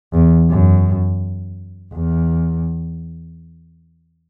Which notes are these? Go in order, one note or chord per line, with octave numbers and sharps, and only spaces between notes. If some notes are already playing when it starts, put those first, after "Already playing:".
E2
F#2
E2